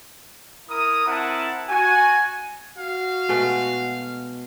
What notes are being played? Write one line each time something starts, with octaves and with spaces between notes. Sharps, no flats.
E4 A#4 D#6
C4 E4 A#4 F#5 A5
F#4 G#5
F#4 F5
B2 G#3 A3